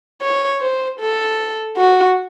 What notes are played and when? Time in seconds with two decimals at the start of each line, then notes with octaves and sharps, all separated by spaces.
0.22 C#5
0.61 C5
1.00 A4
1.77 F#4